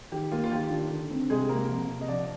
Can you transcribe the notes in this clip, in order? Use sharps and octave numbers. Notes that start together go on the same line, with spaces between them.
D#3 G4
A#3 F4
F4
D#3 G4
D4
D3
C4
C3 G#3 G#4
A#3 C4 A#4
F3
C3
D#5
F3 D4 D5